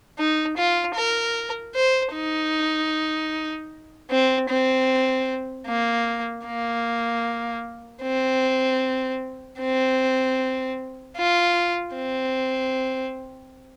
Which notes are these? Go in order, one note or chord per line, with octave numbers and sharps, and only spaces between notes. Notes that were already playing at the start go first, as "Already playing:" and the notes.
D#4
F4
A#4
C5
D#4
C4
C4
A#3
A#3
C4
C4
F4
C4